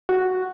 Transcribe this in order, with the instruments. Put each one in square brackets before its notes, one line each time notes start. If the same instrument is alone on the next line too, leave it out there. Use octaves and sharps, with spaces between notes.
[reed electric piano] F#4